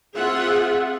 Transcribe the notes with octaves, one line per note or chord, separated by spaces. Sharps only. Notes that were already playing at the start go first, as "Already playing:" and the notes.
C4 F4 G#4 E5 F#5